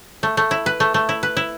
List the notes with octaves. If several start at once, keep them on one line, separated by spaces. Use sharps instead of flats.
A3
A3
E4
B4
A3
A3
E4
B4
E4